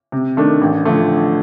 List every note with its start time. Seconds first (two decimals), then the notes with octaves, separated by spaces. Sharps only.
0.12 C3
0.37 D#3 A3 D4
0.61 A1
0.85 D3 F3 A3